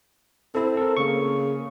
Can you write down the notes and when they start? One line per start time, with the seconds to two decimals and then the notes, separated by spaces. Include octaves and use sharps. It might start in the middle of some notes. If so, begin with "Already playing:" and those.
0.55 C4 E4 A4
0.77 A4 A#4
0.97 C#3 A#3 C#6